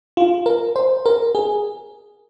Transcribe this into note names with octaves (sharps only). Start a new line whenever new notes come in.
F4
A#4
C5
A#4
G#4